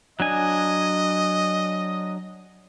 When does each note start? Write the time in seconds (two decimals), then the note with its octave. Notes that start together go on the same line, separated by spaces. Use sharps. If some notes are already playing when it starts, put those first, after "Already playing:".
0.20 F#3 D4 D#5 G#5